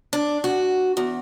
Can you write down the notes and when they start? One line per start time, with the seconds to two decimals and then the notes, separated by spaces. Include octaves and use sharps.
0.13 D4
0.44 F#4
0.97 E2